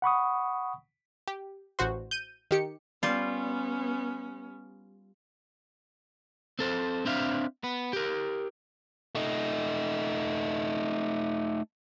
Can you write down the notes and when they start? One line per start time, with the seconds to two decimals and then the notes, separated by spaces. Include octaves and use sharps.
0.02 F#5 B5 C#6 D#6
1.28 G4
1.79 A1 F#4 C5
2.11 G6 D#7
2.51 D#3 G4 C#7
3.03 G3 B3 C#4 F4
6.59 C4 A4 C5
7.06 C4 D4 C5 E5 F5
7.64 B3
7.93 G4 A#4
9.15 A3 D#4